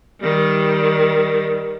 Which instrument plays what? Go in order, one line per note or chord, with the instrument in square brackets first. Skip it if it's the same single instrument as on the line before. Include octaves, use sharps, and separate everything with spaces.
[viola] D#3 G3